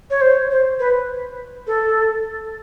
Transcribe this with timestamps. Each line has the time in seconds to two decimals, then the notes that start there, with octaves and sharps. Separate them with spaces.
0.10 C#5
0.21 C5
0.51 C5
0.80 B4
1.67 A4